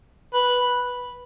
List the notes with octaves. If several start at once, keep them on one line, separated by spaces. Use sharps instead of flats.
B4